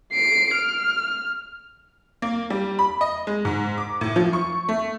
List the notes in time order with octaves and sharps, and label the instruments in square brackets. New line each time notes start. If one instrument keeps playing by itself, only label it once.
[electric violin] C7 D7
F6
[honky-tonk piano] A#3
G3
B5
D#5
G#3
G#2
D6
A2
F3
C#6
A3